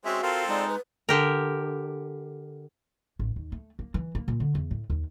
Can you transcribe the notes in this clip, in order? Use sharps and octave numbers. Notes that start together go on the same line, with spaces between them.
G#3 C4 C#4 F#4 E5
C4 F4 A4 A#4 F5
G#3 D#4 D5
B4
D3 G4 A#4
A1
D#2
A3
A#3
E3
A#3
A#2
D3
E2
A2
D#2